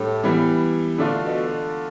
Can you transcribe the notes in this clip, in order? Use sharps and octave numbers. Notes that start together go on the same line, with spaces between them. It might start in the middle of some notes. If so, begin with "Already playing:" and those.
Already playing: A2 G3 D4
E3 G3 B3
A2 D3 A3 D4 F4
B2